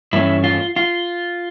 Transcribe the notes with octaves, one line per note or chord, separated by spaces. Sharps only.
G2 E3 A3 C#4 E4
F4
F4